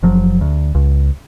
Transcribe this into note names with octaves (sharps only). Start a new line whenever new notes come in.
F#1 F3 F#3
D2
C#2